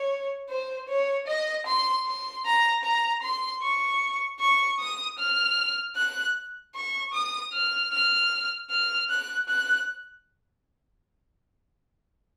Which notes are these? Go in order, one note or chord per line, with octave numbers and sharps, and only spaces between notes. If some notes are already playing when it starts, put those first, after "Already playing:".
Already playing: C#5
C5
C#5
D#5
C6
C6
A#5
A#5
C6
C#6
C#6
D#6
F6
F#6
C#6
D#6
F6
F6
F6
F#6
F#6